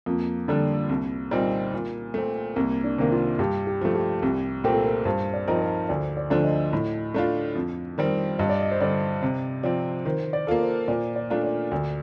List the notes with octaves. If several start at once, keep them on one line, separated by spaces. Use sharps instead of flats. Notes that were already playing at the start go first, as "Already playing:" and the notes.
F2 A#3
D3 G3 A#3 D4
C2
A#2 G3 C4 D#4
A#2
A3 C4
C2 A#3
D4
C3 D#3 A#3
F4
G2 G4
G4
F3 A3
G4
C2
A#2 A3 C4 G4 A#4
A4
A#4
G2 C5
D5
F3 C4 D#4 A#4
C5
D2 D5
D5
D3 F3 A3 D4
D#5
A2
A3 D4 F4
F2
D#3 G3 C4
G2 D#5
D5
D#5
C5
D3 G3 D5
C3
F3 C4 D5
D#3 C5
D5
A#3 F4 A4
C5
A#2 D5
D5
A3 D4 F4
D5
D2 D5